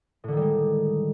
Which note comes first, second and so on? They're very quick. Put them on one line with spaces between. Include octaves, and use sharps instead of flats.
A2 D3 D#3 G3 G#3